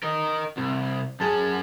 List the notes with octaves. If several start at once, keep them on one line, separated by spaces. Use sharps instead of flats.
A#4 D#5
C2 C3
F#2 C#4 G#4 A5